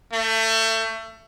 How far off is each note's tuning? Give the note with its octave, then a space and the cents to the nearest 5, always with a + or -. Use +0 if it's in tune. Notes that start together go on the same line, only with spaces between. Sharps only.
A3 +25